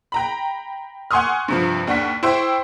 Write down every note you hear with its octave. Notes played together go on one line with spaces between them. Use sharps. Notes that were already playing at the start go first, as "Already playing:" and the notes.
G5 A#5 B5
F#5 G#5 C6 C#6 D#6 F6
G2 C3 F3
D#2 D4 F#5 C#6 B6
E4 C5 G5 C#6